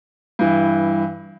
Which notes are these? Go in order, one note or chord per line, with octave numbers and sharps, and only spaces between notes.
G2 E3